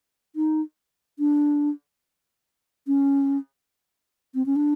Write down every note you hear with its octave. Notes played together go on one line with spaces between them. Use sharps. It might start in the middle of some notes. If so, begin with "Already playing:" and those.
D#4
D4
C#4
C4
C#4
D4